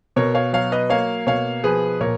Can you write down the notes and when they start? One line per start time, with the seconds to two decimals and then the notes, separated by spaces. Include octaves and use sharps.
0.16 B2 A#4 C#5
0.35 C#5 F5
0.53 F#3 C#5 F5
0.72 B4 D#5
0.90 A#3 C#5 F5
1.27 B2 C#5 F5
1.64 F3 G#4 B4
2.01 A#2 A#4 C#5